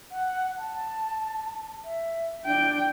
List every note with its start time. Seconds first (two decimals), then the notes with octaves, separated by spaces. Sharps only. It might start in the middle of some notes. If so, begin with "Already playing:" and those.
0.11 F#5
0.58 A5
1.85 E5
2.46 D4 G5